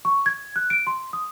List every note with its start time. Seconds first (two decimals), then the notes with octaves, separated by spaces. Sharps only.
0.05 C#6
0.26 G#6
0.56 F#6
0.70 D7
0.87 C6
1.13 D#6